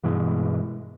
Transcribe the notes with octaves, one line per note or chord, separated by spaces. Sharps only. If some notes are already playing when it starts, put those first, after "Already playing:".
G2 B2 E3 G#3